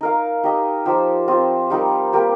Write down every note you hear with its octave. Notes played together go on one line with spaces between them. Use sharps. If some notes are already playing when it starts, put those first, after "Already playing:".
D#4 A#4 F5
D#4 G4 D#5
F3 D#4 G4 C5
C4 F4 C5 D#5
G3 D#4 A#4
A#3 G4 A#4